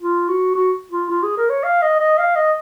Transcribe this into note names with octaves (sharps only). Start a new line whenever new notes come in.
F4
F#4
F#4
F4
F4
G#4
A#4
C#5
F5
D#5
D#5
F5
D#5